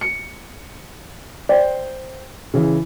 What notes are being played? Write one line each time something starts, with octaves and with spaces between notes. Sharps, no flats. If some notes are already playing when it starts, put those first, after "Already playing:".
C#7
C5 D5 G5
C#3 E3